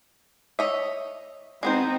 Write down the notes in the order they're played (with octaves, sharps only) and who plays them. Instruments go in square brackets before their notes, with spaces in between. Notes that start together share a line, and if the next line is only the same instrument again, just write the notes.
[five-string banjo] C#5 D#5 E5
[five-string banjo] G#3 B3 C5 [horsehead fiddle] C4 D#4